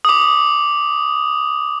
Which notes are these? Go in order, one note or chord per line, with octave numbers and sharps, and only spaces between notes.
D6 D#6